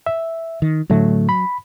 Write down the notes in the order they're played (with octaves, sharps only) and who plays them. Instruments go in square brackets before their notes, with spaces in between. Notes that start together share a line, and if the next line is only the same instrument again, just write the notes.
[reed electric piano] E5
[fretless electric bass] D#3
[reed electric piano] A2 D3 A3 [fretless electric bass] F#3
[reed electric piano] B5